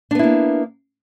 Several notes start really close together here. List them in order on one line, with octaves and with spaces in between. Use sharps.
D4 B3 E4 A#3